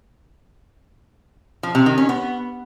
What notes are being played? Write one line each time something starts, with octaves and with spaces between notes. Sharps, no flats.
F3
C3
D#3
C#4
B3